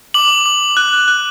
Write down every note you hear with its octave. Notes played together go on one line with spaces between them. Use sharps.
D6 F#7
D6
F#6
F#6